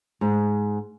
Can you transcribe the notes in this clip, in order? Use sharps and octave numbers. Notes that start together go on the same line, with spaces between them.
G#2